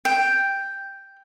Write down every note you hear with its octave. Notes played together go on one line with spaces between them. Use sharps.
G5